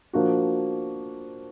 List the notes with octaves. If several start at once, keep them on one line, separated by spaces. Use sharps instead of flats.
F3 A#3 D4 F#4